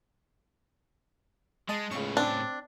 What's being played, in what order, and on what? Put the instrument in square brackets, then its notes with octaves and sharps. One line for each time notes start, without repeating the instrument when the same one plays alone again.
[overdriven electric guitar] G#3 [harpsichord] D#5 A5
[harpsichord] C#2 C#6 [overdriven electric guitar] A2 C#3
[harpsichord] C4 [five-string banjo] D4